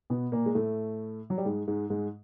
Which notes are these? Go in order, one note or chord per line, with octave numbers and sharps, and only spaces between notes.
B2 B3
A#2 A#3
G#3
A2 A3
F#3
G3
G#2 G#3
G#2 G#3
G#2 G#3